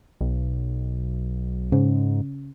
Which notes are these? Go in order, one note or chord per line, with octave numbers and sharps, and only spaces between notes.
B1
G#2 C#3